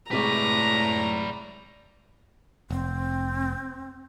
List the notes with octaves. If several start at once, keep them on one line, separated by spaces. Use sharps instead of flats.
A2 C3 G#3 B4 D5 A#5 C#6
F1 C4